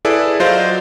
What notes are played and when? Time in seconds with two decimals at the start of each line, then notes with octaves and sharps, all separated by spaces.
0.05 E4 G#4 A4 B4 D5
0.40 F#3 F4 C5 D5 D#5 F5